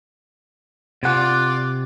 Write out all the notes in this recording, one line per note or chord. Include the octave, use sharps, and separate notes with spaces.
C3 F4 D5 F#5